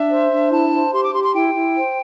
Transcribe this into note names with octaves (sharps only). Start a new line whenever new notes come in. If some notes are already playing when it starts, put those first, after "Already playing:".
Already playing: D4 E5
C5
D4
E4 A5
C5
G4 C6
D6
G4 C6
C6
E4 G5
E4
C5